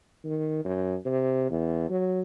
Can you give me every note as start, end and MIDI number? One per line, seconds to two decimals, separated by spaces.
0.24 0.60 51
0.65 0.96 42
1.05 1.47 48
1.51 1.85 40
1.89 2.22 54